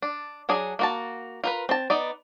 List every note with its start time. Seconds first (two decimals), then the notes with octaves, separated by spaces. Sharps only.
0.02 D4
0.49 F#3 D4 G#4
0.79 A#3 F#4 A5
1.44 F4 A#4 B4
1.69 C4 A5
1.90 B3 D#4 D5